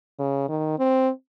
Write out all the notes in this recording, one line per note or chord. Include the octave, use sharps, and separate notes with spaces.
C#3
D#3
C4